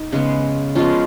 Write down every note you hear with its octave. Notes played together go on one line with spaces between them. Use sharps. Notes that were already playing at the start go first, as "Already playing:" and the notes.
Already playing: D#4
C#3 G#3 B3
F3 G#3 B3 C#4 F4